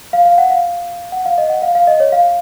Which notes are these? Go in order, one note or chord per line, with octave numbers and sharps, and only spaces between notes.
F5
F5
F#5
F5
F#5
F5
D#5
F#5
F5
F5
D#5
C#5
F5